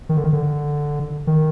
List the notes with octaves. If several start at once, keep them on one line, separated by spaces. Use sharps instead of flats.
D#3
D3
D#3
D3
D#3